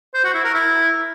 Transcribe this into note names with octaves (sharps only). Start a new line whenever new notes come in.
C5
F#4
E4
A#4
E4